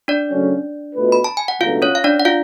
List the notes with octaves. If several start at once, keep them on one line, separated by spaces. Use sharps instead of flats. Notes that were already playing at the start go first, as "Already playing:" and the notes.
D4 D5
C#3 F#3 A3 C#4
B2 A3 F4 B4
B5
A5
G#5
F#5
C#2 B2 F#3 A3 D4 F4 F5
C#4 C#5
F5
D4 D5
F#5
F4 F5